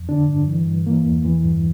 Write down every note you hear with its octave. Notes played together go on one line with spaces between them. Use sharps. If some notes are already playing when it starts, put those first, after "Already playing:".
Already playing: F2
D3 D4
G2
E3
G2
E3 A#3
E2
E3
G2